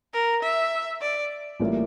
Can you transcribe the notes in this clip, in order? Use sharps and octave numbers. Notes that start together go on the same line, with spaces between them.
A#4
E5
D5
A1 A2 G3 A#3 F4